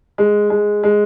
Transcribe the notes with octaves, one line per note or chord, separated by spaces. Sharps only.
G#3
G#3
G#3